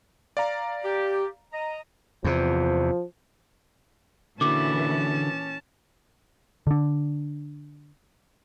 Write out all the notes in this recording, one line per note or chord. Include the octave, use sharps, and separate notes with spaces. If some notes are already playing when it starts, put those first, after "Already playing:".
D5 F5 A#5
G4
D#5 A#5
E2 C3 F3
A#2 D3 E3 C#4 F#4 A5 D6
D3 D4